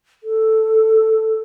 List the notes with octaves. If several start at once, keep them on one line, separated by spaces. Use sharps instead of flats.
A4